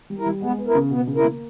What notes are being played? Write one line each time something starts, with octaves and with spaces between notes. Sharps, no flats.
G3
E4 A#4
G3
G#3 B3
B3
E4 A#4
C#3
B2 B3
C#3
E4 A#4
A#3